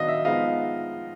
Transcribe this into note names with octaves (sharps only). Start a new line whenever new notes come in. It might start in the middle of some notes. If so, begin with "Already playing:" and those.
Already playing: D#3 F#3 B3 D4 D#5 F5
E5
F3 G#3 B3 D#4 D#5 F5